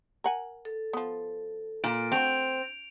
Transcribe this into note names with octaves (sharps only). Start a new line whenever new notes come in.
A#4 F#5 G#5
A4
F3 B3
A#2 D7
A3 C4 F#4 D7 F7